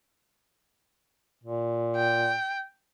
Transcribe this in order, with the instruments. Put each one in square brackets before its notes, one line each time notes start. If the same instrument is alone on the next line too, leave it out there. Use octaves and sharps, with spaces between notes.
[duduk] A#2
[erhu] G5